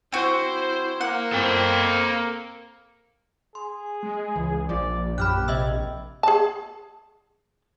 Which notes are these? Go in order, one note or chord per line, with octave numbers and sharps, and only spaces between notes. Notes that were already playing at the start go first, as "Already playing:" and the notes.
C4 E4 F#4 C5
A#3 F#5
C4 A4 C5 G5
G#4 C6
G#3
C#2 E3
A#1 F3 D5
F#2 G4 B5 F6 F#6
C3 D#5 E5 E6
G#4 A5